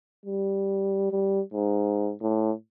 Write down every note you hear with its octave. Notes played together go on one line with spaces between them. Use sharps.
G3
G3
G#2
A2